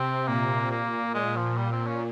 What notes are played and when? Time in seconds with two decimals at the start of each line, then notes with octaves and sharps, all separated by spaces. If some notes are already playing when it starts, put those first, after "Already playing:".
Already playing: C3 C4
0.28 A#2 A#3
0.71 A#3
1.14 A#2 G#3
1.36 F3
1.57 G3
1.72 C4
1.87 C#4